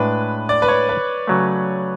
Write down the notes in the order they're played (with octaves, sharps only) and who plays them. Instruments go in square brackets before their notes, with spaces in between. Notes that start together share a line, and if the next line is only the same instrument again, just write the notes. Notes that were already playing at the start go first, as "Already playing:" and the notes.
Already playing: [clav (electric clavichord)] A2 G#3 D4 [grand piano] B4
[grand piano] D5
B4
C#5
B4
[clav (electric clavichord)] C#3 F#3 A3